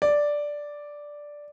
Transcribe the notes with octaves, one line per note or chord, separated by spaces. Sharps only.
D5